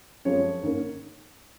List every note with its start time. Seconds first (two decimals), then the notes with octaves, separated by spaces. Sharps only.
0.25 F#2 F3 G#3 C4 C#5
0.62 G#2 D#3 A#3 C#4